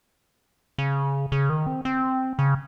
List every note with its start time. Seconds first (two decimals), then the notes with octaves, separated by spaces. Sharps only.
0.78 C#3
1.32 C#3
1.50 D#3
1.67 C4
1.85 C4
2.39 C#3